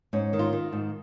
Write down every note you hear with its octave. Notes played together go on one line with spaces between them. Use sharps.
G#2 C#4
D#3
F4
D#3
G#2